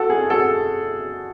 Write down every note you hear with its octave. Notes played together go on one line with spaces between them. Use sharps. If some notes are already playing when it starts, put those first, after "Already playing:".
Already playing: F#4 A4
G#4
F#4 A4